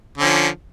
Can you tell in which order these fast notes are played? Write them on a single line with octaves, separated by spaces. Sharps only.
D3 C#4 F3